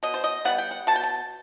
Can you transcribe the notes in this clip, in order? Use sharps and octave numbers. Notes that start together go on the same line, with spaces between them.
B2 D#5
C5
D#5
G3 B3 F#5
G5
F#5
B2 A5
G5
A5